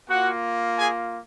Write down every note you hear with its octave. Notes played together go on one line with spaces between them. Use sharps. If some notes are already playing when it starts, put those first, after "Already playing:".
A#3 F4 F#4 F#5
G#4 G#5